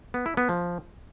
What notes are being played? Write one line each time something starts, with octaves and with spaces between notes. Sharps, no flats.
B3
E4
B3
F3